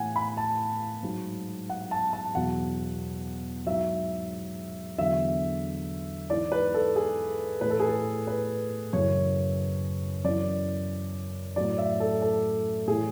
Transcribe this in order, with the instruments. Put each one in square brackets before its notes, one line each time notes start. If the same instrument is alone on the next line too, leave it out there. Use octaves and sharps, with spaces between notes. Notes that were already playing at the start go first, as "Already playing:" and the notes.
Already playing: [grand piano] A2 E3 F#5 G#5
B5
A5
G#2 F#3
F#5
A5
A5
E2 B2 F#3 F#5
G#2 F#3 E5
E2 D3 F#3 E5
G#2 E3 D5
B4
A4
G#4
A2 E3 B4
A4
G#4
A4
B4
F#2 C#3 E3 C#5
F#2 E3 D5
A2 F#3 D5
E5
A4
A4
A2 E3 G#4